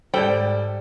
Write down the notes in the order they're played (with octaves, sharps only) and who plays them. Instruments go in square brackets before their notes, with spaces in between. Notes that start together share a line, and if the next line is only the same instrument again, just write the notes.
[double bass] G#2 [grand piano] G3 A4 [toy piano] C5 D5 [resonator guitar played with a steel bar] G5